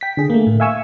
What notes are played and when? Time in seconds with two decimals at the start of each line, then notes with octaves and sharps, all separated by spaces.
0.01 G5 B6
0.17 D3 G#4
0.30 A3 A#3
0.47 A2
0.60 E5 F5 G#5 C#6 E6